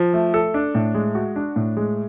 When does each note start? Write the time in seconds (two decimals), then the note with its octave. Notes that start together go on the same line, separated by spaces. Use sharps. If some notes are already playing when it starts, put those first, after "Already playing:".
Already playing: F3
0.13 A3
0.34 A4
0.54 D4
0.75 A2
0.95 G#3
1.15 F#4
1.36 D4
1.56 A2
1.77 G#3